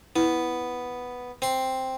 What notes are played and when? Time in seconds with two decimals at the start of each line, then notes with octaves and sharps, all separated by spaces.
0.16 B3 E4
1.42 C4 C6